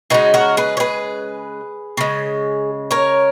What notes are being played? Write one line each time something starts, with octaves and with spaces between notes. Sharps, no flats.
C#3 E3 G#3 D#4 F#4
F#4 A#4
G#4 B4
C#5
G#4 B4
C#3 G#3
A#4 C#5